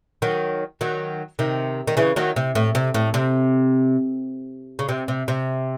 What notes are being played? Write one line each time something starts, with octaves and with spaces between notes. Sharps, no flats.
D#3 F#3
D#3 F#3
C3 D#3
D#3
C#3 E3
D#3 F#3
C3
A2
C3
A2
C3
C#3
C3
C3
C3